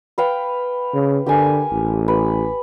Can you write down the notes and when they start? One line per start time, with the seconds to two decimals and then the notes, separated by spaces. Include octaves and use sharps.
0.18 B4 F5 G5
0.94 C#3
1.26 D3 G4 A#4 G#5
1.71 A1
2.08 B4